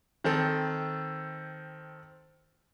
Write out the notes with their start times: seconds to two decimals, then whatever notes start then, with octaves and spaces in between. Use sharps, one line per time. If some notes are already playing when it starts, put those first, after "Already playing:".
0.24 D#3 C4 A4